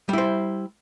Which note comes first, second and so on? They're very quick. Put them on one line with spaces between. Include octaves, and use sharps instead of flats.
G3 E4 C5